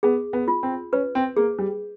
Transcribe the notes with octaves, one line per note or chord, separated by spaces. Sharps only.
B3 G#4
B3
F4
C4
C#4 B4
C4
A#3 G#4
G3